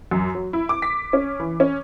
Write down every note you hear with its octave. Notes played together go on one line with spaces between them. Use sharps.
F#2
F#3
E4
D6
B6
C#4
E3
C#4